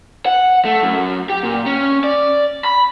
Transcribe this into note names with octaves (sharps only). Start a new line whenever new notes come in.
F#5
A3
F#2
G4
A#2
C#4
D5
B5